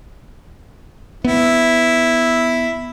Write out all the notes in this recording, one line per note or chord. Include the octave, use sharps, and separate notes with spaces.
B3 E4